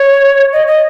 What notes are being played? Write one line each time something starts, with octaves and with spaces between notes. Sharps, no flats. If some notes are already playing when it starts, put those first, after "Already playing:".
Already playing: C#5
D#5
D#5